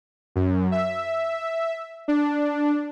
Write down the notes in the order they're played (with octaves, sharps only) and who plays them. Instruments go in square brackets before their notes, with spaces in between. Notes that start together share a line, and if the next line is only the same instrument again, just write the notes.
[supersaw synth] F#2
E5
D4